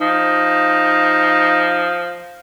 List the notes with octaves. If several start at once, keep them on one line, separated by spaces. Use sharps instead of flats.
F3 D#4